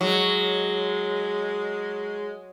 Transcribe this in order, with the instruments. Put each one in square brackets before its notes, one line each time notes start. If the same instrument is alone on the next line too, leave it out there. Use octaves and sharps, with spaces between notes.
[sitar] F#3 [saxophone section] G#3